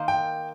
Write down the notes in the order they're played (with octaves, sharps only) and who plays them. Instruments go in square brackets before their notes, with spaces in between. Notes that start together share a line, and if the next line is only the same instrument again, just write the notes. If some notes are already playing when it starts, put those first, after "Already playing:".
Already playing: [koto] D#3 A#3 D#4 C5 D#5
[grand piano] G5